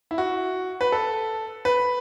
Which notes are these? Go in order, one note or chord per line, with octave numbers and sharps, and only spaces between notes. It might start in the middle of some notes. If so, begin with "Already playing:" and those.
E4
F#4
B4
A4
B4